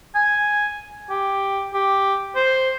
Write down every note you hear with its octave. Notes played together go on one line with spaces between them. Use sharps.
G#5
G4
G4
C5